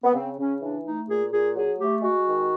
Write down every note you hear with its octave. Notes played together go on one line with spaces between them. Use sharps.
B3
C#3 C4
C#3 C#4
E3 D4
A3 D#4
A#2 G#4
A#2 G#4
F#3 G#4
A3 G4
G#3 F#4
D#3